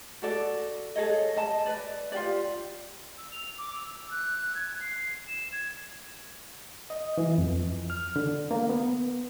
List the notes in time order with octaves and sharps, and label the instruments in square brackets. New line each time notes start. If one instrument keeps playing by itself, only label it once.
[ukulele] F#4 A4 D5
G#4 A4 C#5 D#5
D#5 A5
B4 D5
F4 G4 D5
[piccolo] E6
F7
D6
E6
F#6
G#6
C7
E7
G#6
[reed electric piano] D#5
E3
F2
F6
D3
A#3
B3